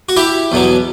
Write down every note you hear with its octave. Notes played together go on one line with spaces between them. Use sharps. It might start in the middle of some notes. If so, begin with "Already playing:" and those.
F#4
E4 G4
E2 B2 F#3